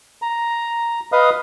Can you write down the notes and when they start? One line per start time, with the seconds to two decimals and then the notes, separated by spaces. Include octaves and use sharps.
0.22 A#5
1.12 B4 D#5 F5 D#6